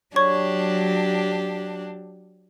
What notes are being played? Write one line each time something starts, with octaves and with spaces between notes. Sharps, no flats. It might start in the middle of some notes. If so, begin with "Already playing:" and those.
F#3 D4 G4 C#5 C#6 G#6